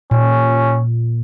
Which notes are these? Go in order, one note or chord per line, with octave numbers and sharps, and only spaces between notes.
A#2 C#4